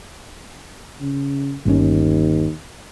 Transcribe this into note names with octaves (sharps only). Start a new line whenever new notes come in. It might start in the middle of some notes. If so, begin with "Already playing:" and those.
C#3
G1 D#2 A#2 C#4